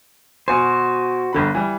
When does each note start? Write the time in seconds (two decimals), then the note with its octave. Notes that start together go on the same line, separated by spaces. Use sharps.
0.48 B2 F#4 C5 G#5
1.33 G1 D3 B5
1.55 E3 G3